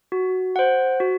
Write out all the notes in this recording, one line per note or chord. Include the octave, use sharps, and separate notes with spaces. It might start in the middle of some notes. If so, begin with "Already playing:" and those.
F#4
C5 F#5
F#4